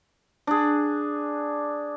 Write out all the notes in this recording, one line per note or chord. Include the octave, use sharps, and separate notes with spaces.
D4 G#4